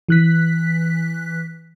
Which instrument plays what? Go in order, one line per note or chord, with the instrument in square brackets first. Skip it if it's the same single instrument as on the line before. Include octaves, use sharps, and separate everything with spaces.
[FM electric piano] E3 F#6 B6